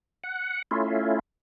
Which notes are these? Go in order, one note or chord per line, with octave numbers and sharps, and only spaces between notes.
F#5
A3 C#4 E4 F4